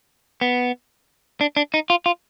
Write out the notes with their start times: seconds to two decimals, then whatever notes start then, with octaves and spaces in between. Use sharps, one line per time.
0.41 B3
1.41 D4
1.57 D4
1.74 D#4
1.90 F4
2.06 F4